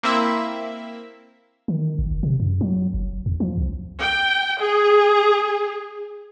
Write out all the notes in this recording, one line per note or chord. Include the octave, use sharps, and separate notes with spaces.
A#3 C4 E4 E5
D#3
G#1
F1
C3
F#2
F#3
F#1
E2
F3
C2
G5
G#4